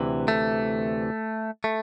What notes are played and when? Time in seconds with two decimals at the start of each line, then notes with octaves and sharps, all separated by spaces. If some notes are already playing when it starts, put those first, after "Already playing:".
Already playing: D2 C3 E3
0.28 A3
1.64 A3